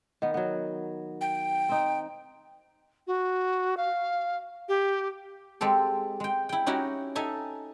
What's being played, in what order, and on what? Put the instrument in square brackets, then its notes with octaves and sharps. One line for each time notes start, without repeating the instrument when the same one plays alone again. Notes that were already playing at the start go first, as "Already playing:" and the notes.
[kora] D#3 B3
F#3 B3
[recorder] G5
[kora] C4 D#4
[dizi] F#4
F5
G4
[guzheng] G#3 C4 G4 A4
G#3 G5
E4 G5
C#4 D#4 E4 F#4 G4
D#4 A4 E5 G#5